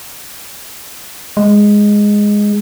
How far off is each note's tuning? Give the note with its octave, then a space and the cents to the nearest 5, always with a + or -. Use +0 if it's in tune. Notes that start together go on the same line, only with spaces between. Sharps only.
G#3 -5